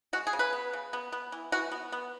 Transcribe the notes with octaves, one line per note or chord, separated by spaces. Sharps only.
G#3 F#4
G#4
C#3
B4
B3
C#3
B3
B3
E3
E3 F#4
B3
B3